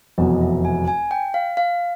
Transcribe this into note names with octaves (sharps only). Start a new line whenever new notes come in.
F1 E2 B2 F#3 D#5
E5
G#5
G#5
G5
F5
F5